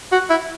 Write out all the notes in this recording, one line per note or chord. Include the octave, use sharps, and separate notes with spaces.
F#4
E4